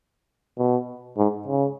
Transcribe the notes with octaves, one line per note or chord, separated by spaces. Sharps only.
B2
G#2
C#3